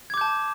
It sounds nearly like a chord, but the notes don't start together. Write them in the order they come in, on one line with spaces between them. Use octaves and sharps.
G#6 D6 G6 A5